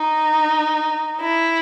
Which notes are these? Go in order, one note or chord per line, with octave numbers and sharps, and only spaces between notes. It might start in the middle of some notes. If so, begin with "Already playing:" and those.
Already playing: D#4
E4